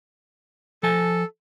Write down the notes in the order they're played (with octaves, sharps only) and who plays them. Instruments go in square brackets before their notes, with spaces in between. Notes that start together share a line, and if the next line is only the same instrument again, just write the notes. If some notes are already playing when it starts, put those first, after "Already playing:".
[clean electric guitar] F3 G#5 A5 [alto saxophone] A4